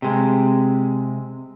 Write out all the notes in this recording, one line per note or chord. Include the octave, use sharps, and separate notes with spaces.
C3 G#3